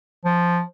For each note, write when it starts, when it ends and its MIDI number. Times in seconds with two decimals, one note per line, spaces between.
0.25 0.61 53